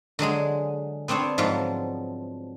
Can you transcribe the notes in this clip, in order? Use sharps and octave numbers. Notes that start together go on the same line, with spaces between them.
D3 F#3 G#3 G#4
B3 C4 D4 C5 C#5
G#2 F3 F#3